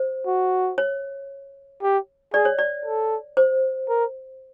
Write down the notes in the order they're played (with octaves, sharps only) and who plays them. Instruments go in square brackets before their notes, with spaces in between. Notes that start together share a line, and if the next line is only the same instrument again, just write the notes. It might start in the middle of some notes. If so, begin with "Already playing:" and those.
Already playing: [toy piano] C5
[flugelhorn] F#4
[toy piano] C#5
[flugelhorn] G4
[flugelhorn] G#4 [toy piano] D5
[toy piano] C#5
D5
[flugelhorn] A4
[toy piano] C5
[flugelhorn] A#4